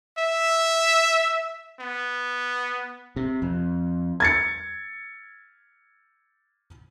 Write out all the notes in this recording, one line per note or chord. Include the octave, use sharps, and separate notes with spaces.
E5
B3
C3
F2
G#6 A6 C#7